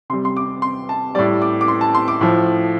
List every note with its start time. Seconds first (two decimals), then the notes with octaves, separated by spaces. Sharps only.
0.10 C3 C6
0.13 G3
0.25 C6
0.37 D6
0.62 C6
0.89 A5
1.15 A2 G3 D5
1.42 D6
1.61 D6
1.68 C6
1.81 A5
1.95 C6
2.08 D6
2.21 A2 F3